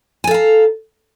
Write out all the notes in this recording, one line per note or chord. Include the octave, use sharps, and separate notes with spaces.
A4 F5 G#5 A#5